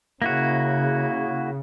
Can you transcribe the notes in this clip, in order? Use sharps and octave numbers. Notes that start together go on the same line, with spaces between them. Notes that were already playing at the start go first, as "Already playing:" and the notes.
C#3 A#3 E4 F#4